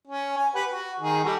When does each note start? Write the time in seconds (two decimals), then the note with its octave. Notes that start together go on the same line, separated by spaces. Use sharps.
0.08 C#4
0.37 G#5
0.55 G4 B4 F#5
0.69 F#4
1.00 D#3 D#4 G#4
1.24 G3 F#4 A4